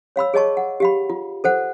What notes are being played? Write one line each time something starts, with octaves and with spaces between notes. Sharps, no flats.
C#5 F5 B5 E6
G#4 C#5 D#5 A5 C#6
F#5
G4 F5 B5
F4
A4 C5 F#5